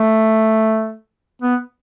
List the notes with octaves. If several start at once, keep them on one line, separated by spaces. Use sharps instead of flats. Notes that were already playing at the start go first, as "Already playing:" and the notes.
Already playing: A3
B3